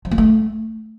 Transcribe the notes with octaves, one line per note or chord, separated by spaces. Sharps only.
F3
A#3
A3